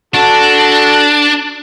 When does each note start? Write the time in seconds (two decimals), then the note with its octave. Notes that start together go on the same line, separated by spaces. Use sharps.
0.15 D4 F#4 A4